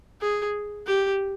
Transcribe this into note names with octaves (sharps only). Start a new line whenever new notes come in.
G#4
G4